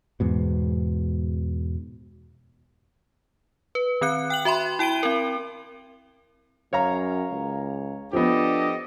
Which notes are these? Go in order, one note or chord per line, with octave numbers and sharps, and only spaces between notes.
E2 G#2 B2
B4
D#3 C4 F#6 C#7
G5 F#6 F#7
F#4 E5 B5 C6
E4 G5 D7 D#7 G7
C4 A#4
F#2 C#5 F5 A#5
C#2
F3 B3 D4 G4 A4 D#5